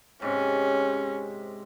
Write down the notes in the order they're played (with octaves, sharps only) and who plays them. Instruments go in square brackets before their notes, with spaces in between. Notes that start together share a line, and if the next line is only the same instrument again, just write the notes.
[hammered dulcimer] G#2 C3 [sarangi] C#4